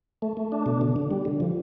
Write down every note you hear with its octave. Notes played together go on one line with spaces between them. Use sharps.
A3
A3
D4
B2
D3
D3
G3
D3
F3